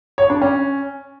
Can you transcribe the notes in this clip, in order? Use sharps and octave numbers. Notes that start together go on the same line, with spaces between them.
C#5
D4
C#4